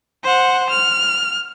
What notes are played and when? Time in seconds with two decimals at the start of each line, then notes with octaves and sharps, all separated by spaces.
0.24 C5 F#5
0.70 F6